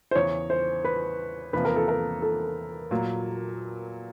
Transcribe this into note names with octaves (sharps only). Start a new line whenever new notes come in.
C5
E2 C#3 E3 C#5
C5
B4
E2 C3 F3 A#3 B4
A#4
A4
A#4
A4
A#2 F#3 A#3